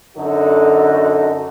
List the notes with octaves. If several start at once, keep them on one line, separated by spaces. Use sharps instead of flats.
F#2 D3 D#4 F#4 A4